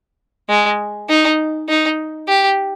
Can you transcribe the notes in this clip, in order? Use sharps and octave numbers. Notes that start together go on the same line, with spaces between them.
G#3
D#4
D#4
G4